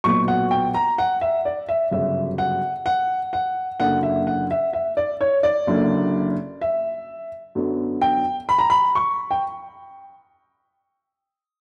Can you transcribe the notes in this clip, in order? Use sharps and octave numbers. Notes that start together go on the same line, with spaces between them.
B1 A#2 F#3 B3 C#6
F#5
G5
A#5
F#5
E5
D5
E5
G1 F#2 C#3 F#3 E5
F#5
F#5
F#5
F#1 F#2 D3 A#3 F#5
E5
F#5
E5
E5
D5
C#5
D5
F#1 F#2 D3 A#3
E5
F#2 D3 F#3 B3
G5
B5
A#5
B5
C#6
G5